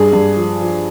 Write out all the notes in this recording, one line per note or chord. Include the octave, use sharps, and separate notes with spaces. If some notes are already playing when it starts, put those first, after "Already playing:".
Already playing: G2 G#4
G2
F3
F3